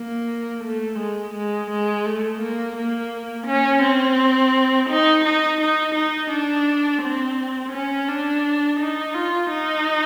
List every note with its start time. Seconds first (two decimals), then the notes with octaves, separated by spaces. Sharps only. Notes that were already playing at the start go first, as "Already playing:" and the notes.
Already playing: A#3
0.64 A3
0.98 G#3
1.34 G#3
1.71 G#3
2.05 A3
2.41 A#3
2.76 A#3
3.47 C#4
3.82 C4
4.89 D#4
5.25 D#4
5.61 D#4
5.95 D#4
6.31 D4
7.02 C4
7.72 C#4
8.08 D4
8.80 D#4
9.14 F4
9.51 D#4